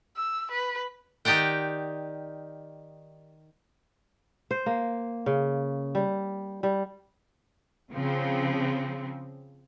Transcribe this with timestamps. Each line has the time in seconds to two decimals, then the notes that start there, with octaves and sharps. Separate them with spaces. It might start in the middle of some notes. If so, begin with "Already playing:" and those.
0.17 E6
0.52 B4
1.25 D#3 D#4 G4 D5 F#5 G5
4.51 C5
4.66 A#3
5.26 C#3
5.95 G3
6.63 G3
7.92 C#3 F3 C4